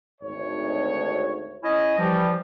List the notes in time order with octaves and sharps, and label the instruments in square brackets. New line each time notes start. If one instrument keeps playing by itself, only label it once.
[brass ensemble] G#1 D2 C#5
[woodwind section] C#4 E4 D#5
[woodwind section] E3 F3 [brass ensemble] G3